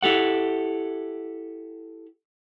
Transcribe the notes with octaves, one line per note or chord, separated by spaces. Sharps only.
E4 G4 A4 F#5